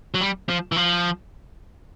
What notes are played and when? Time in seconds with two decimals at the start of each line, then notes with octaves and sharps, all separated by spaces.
0.14 F#3
0.21 G3
0.49 F3
0.72 E3
0.76 F3